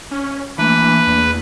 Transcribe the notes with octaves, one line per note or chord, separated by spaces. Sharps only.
C#4
E3 A3 A#3 D4 B4
E2